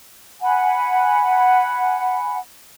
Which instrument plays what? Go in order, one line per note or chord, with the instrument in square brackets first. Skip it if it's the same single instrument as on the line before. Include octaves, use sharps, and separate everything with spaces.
[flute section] F#5 G#5 B5